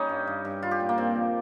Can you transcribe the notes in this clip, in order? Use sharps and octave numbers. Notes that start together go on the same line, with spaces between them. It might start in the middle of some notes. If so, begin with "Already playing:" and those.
Already playing: G3 C#4 D#4
G2
G2
G2
G3 F4
G4
A#2
A#3
G2 C4
F3